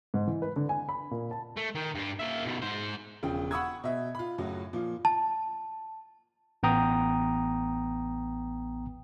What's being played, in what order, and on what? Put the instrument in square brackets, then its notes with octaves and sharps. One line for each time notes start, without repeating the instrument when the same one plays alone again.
[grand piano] G#2
E3
B4
D3
G#5
B5
A#2
A5
[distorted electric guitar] A3
D#3
G2 D4
A#3 E5
B2 D#3
G#2 C5
[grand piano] E1 C#3 F3 G5
F#5 B5 C#6 D#6 E6 G#6
B2 E5
F4 B5
F#2 A2 C#3 F#3
A#2 F3
[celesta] A5
[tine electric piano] A1 B3 G5 A#5 D#6